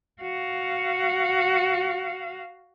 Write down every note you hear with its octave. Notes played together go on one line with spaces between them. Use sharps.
F#4 F5